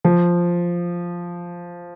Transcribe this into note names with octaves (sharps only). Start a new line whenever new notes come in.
F3